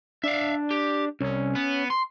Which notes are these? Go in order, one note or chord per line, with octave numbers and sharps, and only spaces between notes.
D4 E5 F5
G4
C2 C#4
B3
C6